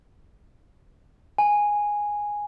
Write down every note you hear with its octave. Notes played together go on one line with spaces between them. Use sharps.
G#5